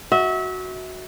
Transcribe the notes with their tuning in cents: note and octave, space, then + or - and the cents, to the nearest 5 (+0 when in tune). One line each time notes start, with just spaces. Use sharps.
F#4 +0 E5 -30